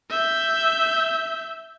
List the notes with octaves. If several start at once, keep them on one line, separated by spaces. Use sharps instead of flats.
E5 G6